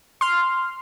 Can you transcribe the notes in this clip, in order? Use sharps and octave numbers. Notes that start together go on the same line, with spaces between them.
C6 F6